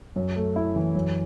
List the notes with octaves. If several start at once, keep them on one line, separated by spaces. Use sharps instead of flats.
F#2
A3
E4
E3
F#2